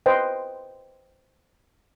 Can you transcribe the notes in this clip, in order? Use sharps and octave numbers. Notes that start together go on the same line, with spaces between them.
B4 C5 D#5 G5